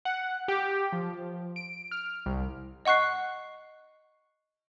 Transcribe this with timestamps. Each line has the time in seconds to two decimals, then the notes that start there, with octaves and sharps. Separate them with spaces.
0.05 F#5
0.48 G4
0.93 F3
1.56 D7
1.91 F6
2.26 C2
2.85 D#5 F#5 C#6 F#6 C7